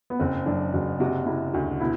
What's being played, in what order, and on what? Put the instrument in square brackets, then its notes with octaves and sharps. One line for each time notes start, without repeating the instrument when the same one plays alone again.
[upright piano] B3
[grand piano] F#1 [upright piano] C4
[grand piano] F#2 [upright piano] D4
[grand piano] F#1 [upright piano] F#4
[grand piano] C3 [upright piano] F#4
[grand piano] C3 [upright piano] E4
[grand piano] D2 [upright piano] F#4
[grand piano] B2 [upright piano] E4